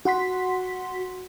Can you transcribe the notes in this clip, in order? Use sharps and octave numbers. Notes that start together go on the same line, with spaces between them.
F#4 F#5 C6 B6